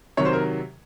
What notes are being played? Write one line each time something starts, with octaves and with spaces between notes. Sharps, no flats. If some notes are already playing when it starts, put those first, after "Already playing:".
C3 D#3 F#3 C#5
C5
A#4